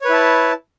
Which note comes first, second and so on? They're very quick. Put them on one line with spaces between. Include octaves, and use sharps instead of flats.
C#5 B4 E4 A5